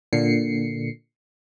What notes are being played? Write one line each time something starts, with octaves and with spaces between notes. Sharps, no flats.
A#2 D3 C7 C#7